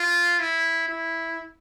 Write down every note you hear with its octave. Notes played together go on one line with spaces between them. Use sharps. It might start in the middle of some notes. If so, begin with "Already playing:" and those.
Already playing: F4
E4
E4